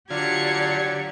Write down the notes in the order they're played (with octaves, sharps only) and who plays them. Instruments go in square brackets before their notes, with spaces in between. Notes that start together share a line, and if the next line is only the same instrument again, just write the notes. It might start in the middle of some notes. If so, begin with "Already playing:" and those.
[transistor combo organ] D3 F4 [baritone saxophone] F#3 [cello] G4 D5 [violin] G#6 C#7